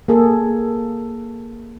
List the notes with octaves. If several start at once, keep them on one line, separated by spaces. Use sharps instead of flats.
A#3 G#4 A4